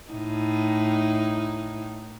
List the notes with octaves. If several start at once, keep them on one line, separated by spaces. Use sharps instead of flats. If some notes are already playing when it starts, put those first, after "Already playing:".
A2 D#4